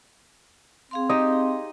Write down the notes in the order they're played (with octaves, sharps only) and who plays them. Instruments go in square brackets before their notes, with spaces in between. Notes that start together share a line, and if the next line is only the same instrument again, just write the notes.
[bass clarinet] C4 [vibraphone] G#4 F5 C6
[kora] D#4 G4 [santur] D#5